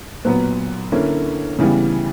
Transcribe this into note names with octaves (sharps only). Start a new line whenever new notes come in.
A#2 F#3 B3 B4
D3 A#3 C#4 E4
C#3 E3 G3 B3